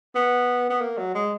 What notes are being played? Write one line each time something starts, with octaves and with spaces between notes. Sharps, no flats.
B3
B3
A#3
F#3
G#3